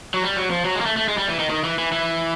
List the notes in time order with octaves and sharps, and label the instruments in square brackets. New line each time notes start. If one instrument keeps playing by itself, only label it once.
[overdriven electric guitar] F#3
G3
F#3
F3
F#3
G#3
A#3
A3
A3
G#3
G3
E3
D#3
D#3
E3
E3
E3